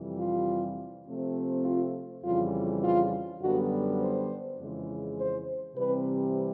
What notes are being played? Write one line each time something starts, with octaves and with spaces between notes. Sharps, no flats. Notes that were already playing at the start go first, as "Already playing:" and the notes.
Already playing: F2 C3 E3 G3
F4
C3 F3 A3 C4
F4
F2 C#3 E3 G3 F4
F4
F#2 D3 G3 B3 F#4
C5
F2 C#3 E3 G#3
C5
C3 E3 G3 C4 B4